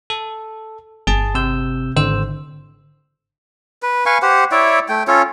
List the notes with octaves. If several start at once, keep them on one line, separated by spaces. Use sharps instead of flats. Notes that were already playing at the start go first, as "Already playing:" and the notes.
A4
G1 G#4 A5
C3 E6 G6
G#1 D3 C5 E6
B4
B4 F5 G#5 C#6
G4 C5 F#5
E4 C#5 D5 E5
A3 G5
C#4 F4 A4 C#5